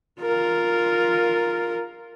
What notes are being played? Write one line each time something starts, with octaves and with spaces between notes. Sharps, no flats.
F4 A#4